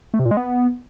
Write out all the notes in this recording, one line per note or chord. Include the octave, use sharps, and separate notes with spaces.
A3
C3
A#2
G#3
B3